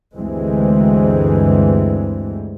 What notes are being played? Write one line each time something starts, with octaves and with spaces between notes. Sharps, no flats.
D2 G2 E3 G#3 C4